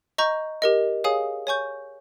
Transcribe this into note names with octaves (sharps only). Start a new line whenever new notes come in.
D#5 A#5 C#6 G6
G4 A#4 D#5
G#4 C#5 F5 G#5 D#6
C#5 G#5 C#6 G6